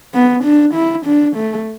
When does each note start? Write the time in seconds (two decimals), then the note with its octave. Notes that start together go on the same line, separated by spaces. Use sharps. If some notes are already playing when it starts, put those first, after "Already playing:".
0.14 B3
0.44 D4
0.74 E4
1.06 D4
1.36 A3